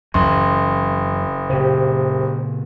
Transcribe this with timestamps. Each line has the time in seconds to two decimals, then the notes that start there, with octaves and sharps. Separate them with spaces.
0.14 F#1 F#2 E3 F#3 C6
1.50 A#2 C#3 G4 C5